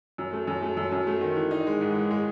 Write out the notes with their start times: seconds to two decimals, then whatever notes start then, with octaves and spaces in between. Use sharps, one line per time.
0.18 F#2
0.33 A3
0.47 F#2
0.62 A3
0.77 F#2
0.92 F#2
1.07 A3
1.21 D#3
1.36 E3
1.51 D#4
1.67 G#3
1.81 G#2
1.95 E3
2.11 G#3